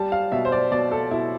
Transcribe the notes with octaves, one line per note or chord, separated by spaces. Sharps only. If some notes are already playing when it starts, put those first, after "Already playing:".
Already playing: G3 A5
F5
B2 E5
C5
D5
B2 D5
A4
B2 E4